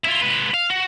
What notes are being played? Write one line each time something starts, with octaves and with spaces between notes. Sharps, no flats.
E4 F4
G#3 B4
F5
F#4